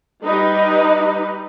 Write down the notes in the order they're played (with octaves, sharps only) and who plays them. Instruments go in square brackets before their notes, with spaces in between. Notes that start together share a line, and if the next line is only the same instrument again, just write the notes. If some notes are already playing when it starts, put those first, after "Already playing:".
[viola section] G3 D#4 B4